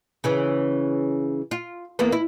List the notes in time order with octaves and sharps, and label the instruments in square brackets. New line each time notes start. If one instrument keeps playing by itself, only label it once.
[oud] C#3 E3 C#4
F4
E2 A#3 B3
E4